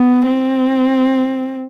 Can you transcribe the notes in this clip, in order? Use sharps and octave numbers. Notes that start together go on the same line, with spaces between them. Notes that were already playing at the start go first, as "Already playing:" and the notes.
Already playing: B3
C4